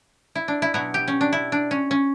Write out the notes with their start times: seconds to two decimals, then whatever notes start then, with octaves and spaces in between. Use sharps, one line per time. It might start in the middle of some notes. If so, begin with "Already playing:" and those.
0.35 E4
0.48 D4
0.62 E4
0.74 B2 F#3 B3 E4
0.94 G4
1.08 C#4
1.21 D4
1.33 E4
1.52 D4
1.71 C#4
1.91 C#4